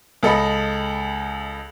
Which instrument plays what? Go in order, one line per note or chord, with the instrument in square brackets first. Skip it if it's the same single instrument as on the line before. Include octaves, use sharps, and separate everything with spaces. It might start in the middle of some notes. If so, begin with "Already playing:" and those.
[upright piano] C#2 A4 D#5 B5